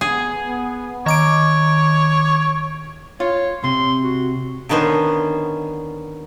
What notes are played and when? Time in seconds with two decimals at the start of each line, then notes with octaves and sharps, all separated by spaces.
0.01 B3 G#4
0.47 B3
1.06 D#3 C#5 D6 D7
3.20 F4 C#5
3.64 C3 C6
4.03 F#4
4.69 D3 D#3 B3 C#4 C5